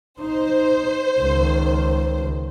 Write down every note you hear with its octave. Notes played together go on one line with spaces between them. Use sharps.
D#4 C5
C#2 D#3